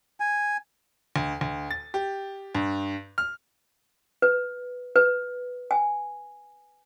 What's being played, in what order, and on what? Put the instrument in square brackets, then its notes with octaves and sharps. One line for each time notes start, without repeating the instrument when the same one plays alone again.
[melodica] G#5
[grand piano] D2
D2
A6
G4
G2
F6
[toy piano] B4
B4
G#5